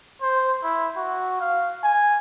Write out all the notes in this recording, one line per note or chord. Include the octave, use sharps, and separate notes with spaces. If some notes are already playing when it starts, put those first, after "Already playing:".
C5
E4
F#4
F5
G#5